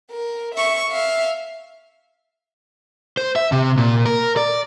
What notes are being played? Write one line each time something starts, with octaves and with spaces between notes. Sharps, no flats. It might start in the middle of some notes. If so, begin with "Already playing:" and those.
A#4
E5 C#6
E5 F5
C5
E5
C3
A#2
A#4
D5